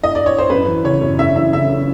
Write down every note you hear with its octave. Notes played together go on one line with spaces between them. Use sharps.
D#5
D5
C#5
C5
F#2 B4
E3
C#3 C#5
F#2
F#2 E5
E3 E5
C#3 E5